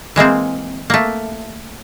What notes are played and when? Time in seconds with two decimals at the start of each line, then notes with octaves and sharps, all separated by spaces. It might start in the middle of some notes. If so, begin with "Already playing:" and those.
0.16 E3 G#3 A#3 C4
0.90 A3 A#3